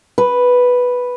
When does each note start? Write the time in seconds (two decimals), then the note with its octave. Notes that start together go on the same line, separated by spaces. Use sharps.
0.18 B4